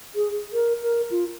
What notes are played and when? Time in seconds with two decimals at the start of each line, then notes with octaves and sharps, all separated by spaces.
0.15 G#4
0.53 A#4
0.82 A#4
1.11 F4